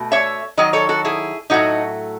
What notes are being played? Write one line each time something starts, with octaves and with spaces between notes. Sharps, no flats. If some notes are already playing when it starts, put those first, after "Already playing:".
Already playing: B2 A3
C#5 E5
D#3 F#3 D#5
A4 C#5
F#4 A4
E4 G#4
A2 F#3 A3 D#4 F#4